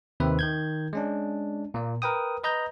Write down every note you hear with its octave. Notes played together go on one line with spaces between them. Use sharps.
D#2 C3 D#3 C4 B4 E5
D#3 G6 G#6
G#3 C#4 D4
A#2 A#3
A#4 B4 G5 D#6
B4 D#5 A#5 G6